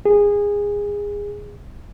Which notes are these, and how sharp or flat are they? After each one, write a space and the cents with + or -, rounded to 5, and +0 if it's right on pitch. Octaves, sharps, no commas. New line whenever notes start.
G#4 -20